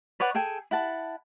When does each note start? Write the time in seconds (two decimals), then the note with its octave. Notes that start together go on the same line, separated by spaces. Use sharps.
0.20 B4 C#5 D5 F#5
0.35 G#4 A4 G5 G#5
0.71 E4 F#5 A5